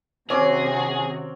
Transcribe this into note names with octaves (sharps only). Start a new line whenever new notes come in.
C3 D#3 C4 C#4 F#4 G#4 D6